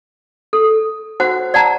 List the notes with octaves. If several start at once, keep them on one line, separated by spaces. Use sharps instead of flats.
A4
F#4 C5 F#5
D5 F#5 A5 A#5